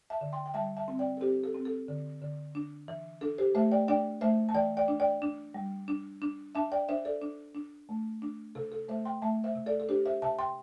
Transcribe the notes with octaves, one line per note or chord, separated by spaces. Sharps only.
E5 A5
D3
G5 C6
G5
G3 E5 A5
E5 A5
C4
D5 G5
A4
C4 G4 C5
A4
C4
A4
D3
D3
D4
E3
D4 A4
G4 C5
A3 C5 E5
D5 G5
D4 D5 G5
A3 C5 E5
A5
E3 D5 G5
D5 G5
D4
D5 G5
D4
G3
D4
D4
D4 E5 A5
D5 G5
D4 C5 E5
A4 D5
D4
D4
A3
D4
C3 A4
A4
A3 C5 E5
G5 C6
A3 E5 A5
C5 E5
C3
A4 D5
A4
D4 G4 C5
C5 E5
C3 E5 A5
G5 C6